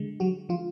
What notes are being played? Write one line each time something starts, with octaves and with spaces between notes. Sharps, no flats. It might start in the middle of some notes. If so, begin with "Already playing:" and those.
Already playing: D3 G#3
F#3 F#4
F3 F4